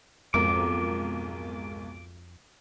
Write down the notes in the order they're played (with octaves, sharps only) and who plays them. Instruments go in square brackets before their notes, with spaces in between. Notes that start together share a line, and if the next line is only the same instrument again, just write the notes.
[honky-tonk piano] B1 G#2 A#4 [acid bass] F2 [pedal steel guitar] D6